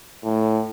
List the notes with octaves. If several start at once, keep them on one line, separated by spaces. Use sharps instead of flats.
A2